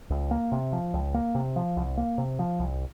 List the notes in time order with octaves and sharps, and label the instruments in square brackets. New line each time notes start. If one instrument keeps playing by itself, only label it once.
[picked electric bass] C#2
A#3
C3
F3
C#2
A#3
C3
F3
C2
A#3
C3
F3
C2